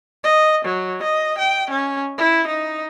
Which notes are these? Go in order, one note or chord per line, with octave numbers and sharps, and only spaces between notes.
D#5
F#3
D#5
G5
C#4
E4
D#4